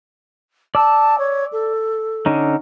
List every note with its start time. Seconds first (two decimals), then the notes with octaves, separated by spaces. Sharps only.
0.75 D5 A5 E6
1.18 C#5
1.52 A4
2.26 D3 C#4 D#4